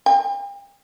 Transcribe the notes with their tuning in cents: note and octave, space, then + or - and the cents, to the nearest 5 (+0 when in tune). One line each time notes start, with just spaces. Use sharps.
G5 +40